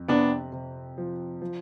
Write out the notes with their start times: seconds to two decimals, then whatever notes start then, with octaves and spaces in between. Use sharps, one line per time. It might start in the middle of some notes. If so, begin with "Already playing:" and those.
Already playing: F2
0.08 C3 B3 D4
0.52 C3
0.98 F3
1.42 F3